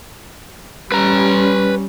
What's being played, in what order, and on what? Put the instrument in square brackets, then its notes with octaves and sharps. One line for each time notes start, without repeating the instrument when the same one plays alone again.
[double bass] G3 C#4 [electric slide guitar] B4 A#5